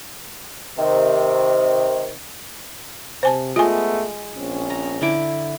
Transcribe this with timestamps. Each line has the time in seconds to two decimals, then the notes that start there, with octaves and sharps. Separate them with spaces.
0.78 C3 D#3
3.23 C3 C5 G#5 A5
3.56 G#3 A3 B3 F4 G#4 G#5
4.33 A#1 C4 C#4
4.70 A#5
5.01 D3 E4 D6